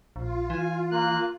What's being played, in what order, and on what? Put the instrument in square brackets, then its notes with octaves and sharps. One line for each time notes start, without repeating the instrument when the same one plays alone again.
[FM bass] A#1 [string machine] F4
[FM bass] E3 [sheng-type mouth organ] G#5
[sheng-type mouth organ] A#3 F#6